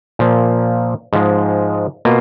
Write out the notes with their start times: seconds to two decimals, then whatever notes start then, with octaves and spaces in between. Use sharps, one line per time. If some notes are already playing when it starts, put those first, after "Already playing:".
0.19 A#2 F3 A#3
1.13 G#2 F3 G#3
2.05 B2 A#3 F4